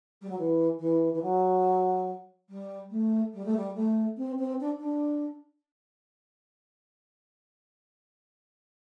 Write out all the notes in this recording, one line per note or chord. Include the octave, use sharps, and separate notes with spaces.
G3
F#3
E3
E3
E3
F#3
G3
A3
G3
A3
G3
A3
C4
C4
D4
D4